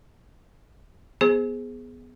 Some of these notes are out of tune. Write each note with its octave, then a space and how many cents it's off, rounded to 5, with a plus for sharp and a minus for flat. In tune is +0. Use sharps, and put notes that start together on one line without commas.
B3 +0 G#4 +0 C5 +0